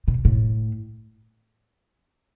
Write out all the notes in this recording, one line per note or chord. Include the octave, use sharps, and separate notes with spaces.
B2
A2